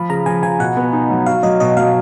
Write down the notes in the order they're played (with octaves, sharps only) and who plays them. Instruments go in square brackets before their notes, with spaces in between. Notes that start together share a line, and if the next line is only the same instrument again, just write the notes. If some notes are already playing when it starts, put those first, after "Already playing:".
Already playing: [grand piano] F3 [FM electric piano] B5
[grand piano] C#3 [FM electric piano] A#5
[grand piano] F3 [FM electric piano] G#5
[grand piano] F3 [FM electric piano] G#5
[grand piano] B2 [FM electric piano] F#5
[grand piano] B3
D#4
F#3
[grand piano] F#4 [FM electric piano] F5
[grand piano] F#3 [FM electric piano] D#5
[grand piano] B2 [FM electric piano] D#5
[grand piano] F#3 [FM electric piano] F5